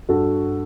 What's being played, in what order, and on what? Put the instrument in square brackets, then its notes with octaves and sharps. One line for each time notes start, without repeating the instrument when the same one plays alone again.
[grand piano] G2 F#4 A4